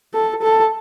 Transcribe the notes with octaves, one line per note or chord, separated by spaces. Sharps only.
A4
A4